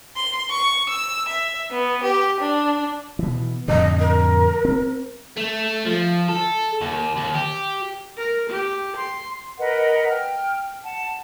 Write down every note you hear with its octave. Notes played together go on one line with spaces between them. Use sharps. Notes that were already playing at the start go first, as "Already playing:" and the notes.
C6
C#6
E6
E5
B3
G4
D4
B2 E3
F2 A2 D3 D#5
A#4
C4
A3
F3
A4
D#2
D#2
G4
A#4
G4
C6
A#4 B4 D#5 F#5
G5 F6
F#5 A5